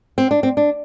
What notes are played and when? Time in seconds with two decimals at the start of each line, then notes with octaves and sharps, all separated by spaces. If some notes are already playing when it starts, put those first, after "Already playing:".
0.18 C4
0.31 D4
0.43 C4
0.57 D4